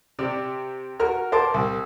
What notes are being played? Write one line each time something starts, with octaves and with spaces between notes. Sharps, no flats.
C3 G4 D5
F#4 A#4 A#5 F6
A#4 C5 A5 D6
C2